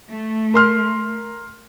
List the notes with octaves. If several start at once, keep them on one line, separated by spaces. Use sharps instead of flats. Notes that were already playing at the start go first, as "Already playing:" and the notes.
A3
A#4 C6 F6